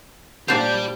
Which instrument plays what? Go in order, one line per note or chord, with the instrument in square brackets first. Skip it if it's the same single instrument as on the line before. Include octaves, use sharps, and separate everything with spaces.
[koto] A#2 D4 C5 [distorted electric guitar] G4 D5